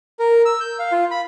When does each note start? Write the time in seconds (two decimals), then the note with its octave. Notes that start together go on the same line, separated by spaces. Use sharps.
0.19 A#4
0.45 E6
0.61 G6
0.79 F5
0.92 F4
1.11 B5